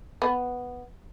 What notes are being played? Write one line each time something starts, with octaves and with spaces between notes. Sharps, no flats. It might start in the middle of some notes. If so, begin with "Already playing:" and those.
B3